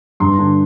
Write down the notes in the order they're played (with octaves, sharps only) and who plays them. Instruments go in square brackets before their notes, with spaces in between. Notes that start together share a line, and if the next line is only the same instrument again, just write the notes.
[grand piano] G2 C6
D3